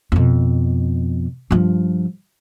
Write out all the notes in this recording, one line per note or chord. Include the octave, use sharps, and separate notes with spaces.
F2 B2
G2 F3